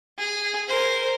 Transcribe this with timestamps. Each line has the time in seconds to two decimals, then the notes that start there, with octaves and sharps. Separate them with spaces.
0.18 G#4
0.68 A#4 C5